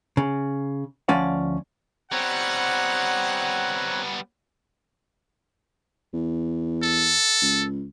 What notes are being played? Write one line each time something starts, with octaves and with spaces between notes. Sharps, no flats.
C#3
D2 F3 C#4 D5 F5 F#5
G3 B3 C4 C#5 F#5 A#5
E2
A4
C#2